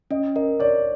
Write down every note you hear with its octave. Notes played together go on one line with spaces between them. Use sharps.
C#4 D#5
A#4 D#5
C#5 D5